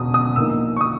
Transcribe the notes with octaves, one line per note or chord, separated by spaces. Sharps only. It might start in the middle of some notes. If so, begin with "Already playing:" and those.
Already playing: E1 E2 B2 D#6
D#6
A#1 A#2 A#3 D#4 E6
C#6
D#6